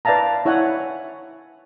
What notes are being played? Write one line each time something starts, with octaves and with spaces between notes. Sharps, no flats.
B4 D5 E5 F5 A5 A#5
E4 C#5 E5 F#5 G#5